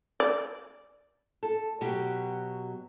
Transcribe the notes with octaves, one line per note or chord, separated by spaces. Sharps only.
D5
A4
B2 F#3 G4